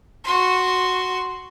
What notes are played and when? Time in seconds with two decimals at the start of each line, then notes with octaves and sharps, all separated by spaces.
0.24 F#4 C6